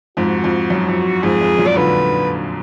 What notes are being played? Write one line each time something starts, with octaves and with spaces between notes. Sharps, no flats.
F2 G#2 F#4
F2
F#2
F2
F2 G#2 G#4
F2 G#2
F#2 A#2
D5
A#2 D3 B4